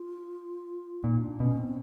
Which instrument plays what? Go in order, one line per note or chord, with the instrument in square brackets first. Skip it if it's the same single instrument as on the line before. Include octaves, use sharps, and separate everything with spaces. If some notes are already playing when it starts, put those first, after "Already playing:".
Already playing: [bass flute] F4
[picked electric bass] A#2 [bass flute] D#4
[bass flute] D4
[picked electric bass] B2 [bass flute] C#4
[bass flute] C4